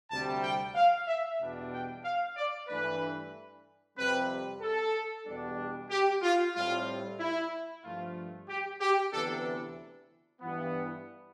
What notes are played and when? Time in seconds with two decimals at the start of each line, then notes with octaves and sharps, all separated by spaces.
0.11 D2 C3 G3 A5
0.43 G5
0.75 F5
1.07 E5
1.40 E2 B2 G3 D4
1.72 G5
2.04 F5
2.37 D5
2.68 G2 E3 A3 D4 B4
3.97 F2 C3 G3 C4 B4
4.62 A4
5.27 E2 B2 G3 B3 D4
5.90 G4
6.23 F4
6.55 A2 G3 C4 F4
7.20 E4
7.84 G2 F3 A3 F4
8.49 G4
8.81 G4
9.13 D2 C3 E3 B3 D4 A4
10.41 G2 E3 B3